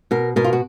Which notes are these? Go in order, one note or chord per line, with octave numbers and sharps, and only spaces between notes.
B2 A#4
B2 A#4
F4
F#4